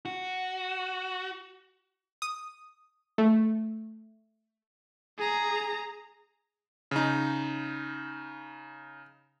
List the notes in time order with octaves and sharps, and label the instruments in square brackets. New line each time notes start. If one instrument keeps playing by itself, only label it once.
[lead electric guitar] F#4
[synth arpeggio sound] D#6
A3
[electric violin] G#4 A#5
[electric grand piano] C#3 D#4